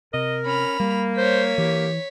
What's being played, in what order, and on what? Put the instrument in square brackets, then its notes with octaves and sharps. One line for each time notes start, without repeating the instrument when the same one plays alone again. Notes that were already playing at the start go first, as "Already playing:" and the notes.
[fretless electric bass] C3 [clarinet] A#4 [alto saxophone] D#5
[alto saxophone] C#4 [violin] B5 F7
[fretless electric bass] G3 [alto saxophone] A#3
[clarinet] C5 [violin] C#5 B6
[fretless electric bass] E3 [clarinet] G4